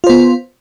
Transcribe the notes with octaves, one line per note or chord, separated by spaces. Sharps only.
B3 F4 C5